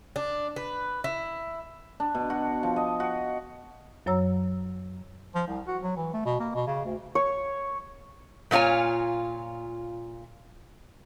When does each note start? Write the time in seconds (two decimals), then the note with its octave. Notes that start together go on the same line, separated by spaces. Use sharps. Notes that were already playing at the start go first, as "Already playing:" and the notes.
0.16 D4
0.56 B4
1.04 E4
2.00 D4
2.15 B2
2.30 F#4
2.63 F3
2.76 D#5
3.00 F#4
4.06 F#2 F#3 C#5 A#5 E6
5.35 F3
5.47 C2
5.67 F#4
5.83 F#3
5.97 E3
6.14 A3
6.26 B2
6.40 A#3
6.55 B2
6.67 C#3
6.85 D2
7.15 C#5
8.51 A#2 A#3 F4 C#5 G#5